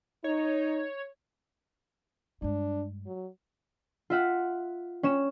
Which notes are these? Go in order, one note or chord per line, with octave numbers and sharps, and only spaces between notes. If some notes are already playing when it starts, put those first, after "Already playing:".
D#4 C#5
G2 G#3 D4
F#3
F4 E5 F#5
C#4 C#5 E7